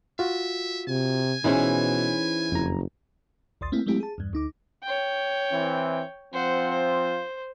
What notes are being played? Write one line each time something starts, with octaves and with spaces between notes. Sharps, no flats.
F4 F#4 E5
C3 G#5
B2 E3 C#4 D#4 E4 G#4 C5
F#1 F2 A#5
A#1 D#2 D5 C6 D#6 A6
A3 A#3 C4 E4
F#3 G#3 A3 C4 E4 G4
G#4 A5
E2 G2
D2 D#4 D6
C#5 G5
E3 C4 E4
F3 C4 F4 C5 F#5
C5